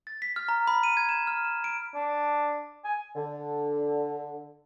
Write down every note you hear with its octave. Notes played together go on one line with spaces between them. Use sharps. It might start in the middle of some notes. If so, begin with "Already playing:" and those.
A6
B6
F6
A#5
B5
D#7
G#6
E7
F6
E7
D7
D4
G#5
D3